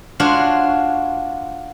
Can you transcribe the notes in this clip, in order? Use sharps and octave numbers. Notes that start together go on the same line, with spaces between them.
D4 F4 F#4 C5 C#5